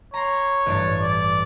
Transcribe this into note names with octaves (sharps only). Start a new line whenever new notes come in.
C#5 A#5 C6
A1 G2 A6
D5